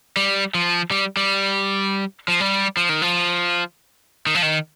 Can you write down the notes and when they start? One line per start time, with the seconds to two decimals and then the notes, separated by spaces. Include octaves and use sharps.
0.17 G3
0.54 F3
0.91 G3
1.17 G3
2.28 F3
2.40 G3
2.77 F3
2.89 D#3
3.02 F3
4.27 D#3
4.35 F3
4.42 D#3